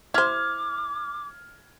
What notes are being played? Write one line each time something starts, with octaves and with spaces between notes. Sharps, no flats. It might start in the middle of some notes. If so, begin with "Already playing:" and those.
E4 C5 D6 F6 G#6